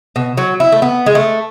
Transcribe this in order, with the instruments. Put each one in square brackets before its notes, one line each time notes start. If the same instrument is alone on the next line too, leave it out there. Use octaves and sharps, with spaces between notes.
[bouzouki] B2
F#3
E4
A3
B3
G#3
A3